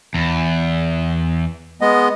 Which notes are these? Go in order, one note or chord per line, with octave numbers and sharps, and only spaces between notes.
E2
G#3 B3 D#5